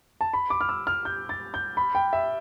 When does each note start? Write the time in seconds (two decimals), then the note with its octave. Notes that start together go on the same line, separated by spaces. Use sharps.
0.21 A5
0.33 B5
0.50 D6
0.61 F6
0.69 E6
0.87 F6
1.05 G6
1.29 A6
1.54 G6
1.77 B5
1.95 G5
2.13 E5